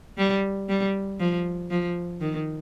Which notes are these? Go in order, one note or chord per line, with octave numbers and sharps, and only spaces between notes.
G3
G3
F3
F3
D#3